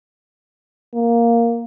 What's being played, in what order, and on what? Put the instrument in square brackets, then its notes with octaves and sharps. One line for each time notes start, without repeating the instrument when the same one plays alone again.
[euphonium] A#3